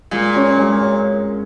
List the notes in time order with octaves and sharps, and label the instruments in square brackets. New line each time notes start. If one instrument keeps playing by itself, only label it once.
[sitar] A#2 [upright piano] G#3
[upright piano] C#4 F#4 C#5
G#3
C#5